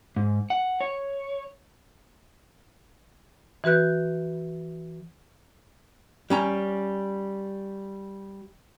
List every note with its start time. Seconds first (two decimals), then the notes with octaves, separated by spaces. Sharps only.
0.16 G#2
0.50 F#5
0.81 C#5
3.64 E3 F#4 B4 F#6 G6
6.30 G3 C#4 A#5